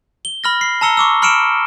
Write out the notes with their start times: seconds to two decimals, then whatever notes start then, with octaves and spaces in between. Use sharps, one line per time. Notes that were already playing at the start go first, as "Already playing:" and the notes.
0.25 G7
0.44 B5 F6 A#6
0.61 C7
0.81 A5 A#5 E6 C#7 G7
0.97 C#6 D6 E6
1.22 B5 F6 C#7 D7 E7